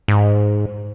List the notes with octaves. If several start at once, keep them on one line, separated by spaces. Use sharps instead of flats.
G#2